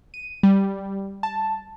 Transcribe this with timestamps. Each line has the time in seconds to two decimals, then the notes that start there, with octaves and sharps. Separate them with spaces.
0.14 D#7
0.43 G3
1.23 A5